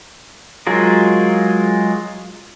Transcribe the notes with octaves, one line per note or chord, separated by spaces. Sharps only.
F#3 G#3 F4 G#4 A#4